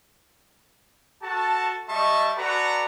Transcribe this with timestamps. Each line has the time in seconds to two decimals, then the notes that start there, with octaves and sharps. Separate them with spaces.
1.22 F#4 A4 A5
1.89 G3 D#5 E5 A5 C#6
2.37 F#4 A4 B4 D5 A#5